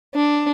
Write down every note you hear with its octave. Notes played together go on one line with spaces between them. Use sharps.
D4